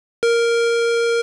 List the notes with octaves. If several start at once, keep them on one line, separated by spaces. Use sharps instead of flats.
A#4